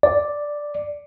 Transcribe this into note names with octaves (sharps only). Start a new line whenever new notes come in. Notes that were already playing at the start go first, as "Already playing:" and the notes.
D5